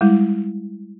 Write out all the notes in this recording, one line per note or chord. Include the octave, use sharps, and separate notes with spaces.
G3 G#3 E4